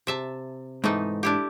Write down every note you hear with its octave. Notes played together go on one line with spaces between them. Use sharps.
C3 E5 A5
G#2 E3 A3 D#4
D4 E4 G4